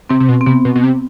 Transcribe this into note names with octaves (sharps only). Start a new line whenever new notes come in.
C3 C4
C3
B2
C4
C3 B3
B2
B2
C3